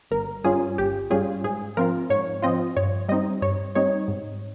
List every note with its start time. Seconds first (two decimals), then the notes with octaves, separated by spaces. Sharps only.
0.11 G1 A#4
0.44 G2 G3 C#4 F4 G#4
0.78 G1 G4
1.11 G2 G3 C#4 F4 G#4
1.44 G#2 G#4
1.77 F3 C4 F4 A#4
2.10 G#2 C#5
2.42 F3 C4 F4 D#5
2.77 G2 C#5
3.09 G3 C4 D#4 D#5
3.42 G2 C#5
3.75 G3 C4 D#4 C#5
4.08 G#2